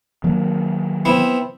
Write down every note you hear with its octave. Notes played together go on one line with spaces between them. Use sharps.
D#3 F#3 A#3
B3 C4 E4